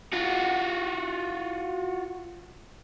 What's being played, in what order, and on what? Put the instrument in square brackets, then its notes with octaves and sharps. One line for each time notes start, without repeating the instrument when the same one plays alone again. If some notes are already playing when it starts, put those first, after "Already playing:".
[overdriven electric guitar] F4 F#4